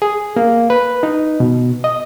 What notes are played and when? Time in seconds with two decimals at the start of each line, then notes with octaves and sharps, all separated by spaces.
0.02 G#4
0.36 A#3
0.70 B4
1.03 D#4
1.40 B2
1.84 D#5